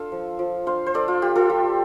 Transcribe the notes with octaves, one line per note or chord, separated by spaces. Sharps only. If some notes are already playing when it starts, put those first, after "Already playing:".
Already playing: D4 F4 A4
F3
F3
D4 C5 F5
C5
D4 A4 D5
F4
F4 G4
F4 A4
G3 F4